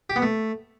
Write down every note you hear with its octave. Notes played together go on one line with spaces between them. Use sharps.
G4
B3
A3